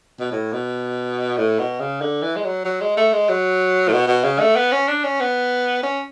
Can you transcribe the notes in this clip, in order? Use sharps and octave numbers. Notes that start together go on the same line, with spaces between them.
B2
A2
B2
A2
B2
C#3
D3
E3
G#3
F#3
F#3
G#3
A3
G#3
F#3
A2
B2
B2
C#3
A3
B3
C#4
D4
C#4
B3
C#4